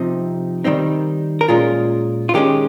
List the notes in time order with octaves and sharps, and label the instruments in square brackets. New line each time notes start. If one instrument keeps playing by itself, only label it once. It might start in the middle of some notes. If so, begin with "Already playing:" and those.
Already playing: [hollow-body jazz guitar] C3 F3 C4 D#4
D#3 G3 C4 D#4
A#4
A#2 G#3 C#4 F4 G#4
F4
D#3 G#3 C#4 G4